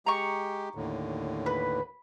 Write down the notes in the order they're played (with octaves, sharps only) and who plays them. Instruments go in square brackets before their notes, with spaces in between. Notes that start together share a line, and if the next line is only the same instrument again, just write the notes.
[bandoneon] G#3 G4 [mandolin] A#5 C#6
[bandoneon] D#2 A2 D3
[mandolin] B4